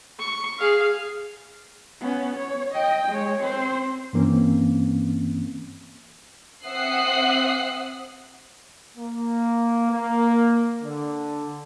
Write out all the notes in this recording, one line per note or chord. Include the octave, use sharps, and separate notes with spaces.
C#6
G#4 F5
B3 C#4
C#5
D#5 G5
G#3 C#5
C4 C5
G2 E3 A#3 C4 C#4
C4 E5 F#5 D#6 F#6 C7
A#3
A#3
D3